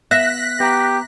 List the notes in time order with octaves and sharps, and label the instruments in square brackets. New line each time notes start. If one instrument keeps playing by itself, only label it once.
[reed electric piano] B3 [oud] E5 [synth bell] F#6 A#6 B6
[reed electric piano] B3 A#5 [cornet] G4